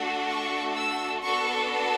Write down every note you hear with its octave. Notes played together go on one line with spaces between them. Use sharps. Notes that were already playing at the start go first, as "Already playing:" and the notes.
Already playing: A3 D4 F#4 A4
C#6
E6
B3 D4 F#4 A4 C#6